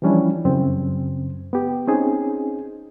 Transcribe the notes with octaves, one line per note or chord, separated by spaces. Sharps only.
E3 F3 G3 C#4 D4 E4
F#2 C#3 C4
B3 G4
C4 C#4 D#4 G#4